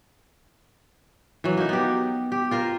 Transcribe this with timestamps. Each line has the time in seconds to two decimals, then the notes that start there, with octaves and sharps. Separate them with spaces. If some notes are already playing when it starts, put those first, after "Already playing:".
1.44 E3 F#3
1.57 A#3 D#4
1.69 B3 G4
2.32 G4
2.51 F4 A#4 C5